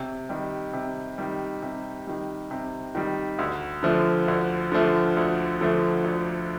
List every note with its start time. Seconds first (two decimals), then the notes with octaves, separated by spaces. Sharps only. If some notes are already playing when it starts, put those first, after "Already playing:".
Already playing: C3
0.29 D#3 G3
0.73 C3
1.18 D#3 G3
1.62 C3
2.07 D#3 G3
2.51 C3
2.95 D#3 G3
3.39 D2
3.83 D3 F3 A3
4.28 D2
4.72 D3 F3 A3
5.17 D2
5.61 D3 F3 A3
6.04 D2